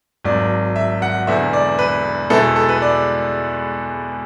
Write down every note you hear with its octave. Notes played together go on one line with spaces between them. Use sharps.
G#1 G#2 F#3 D5
E5
F#5
E1 E2 D3 E5
D5
B4
E2 B2 G#3 B3 E4 A4
A4
B4
D5